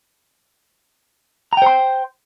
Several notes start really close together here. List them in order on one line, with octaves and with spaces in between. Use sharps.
A#5 G5 C5 C6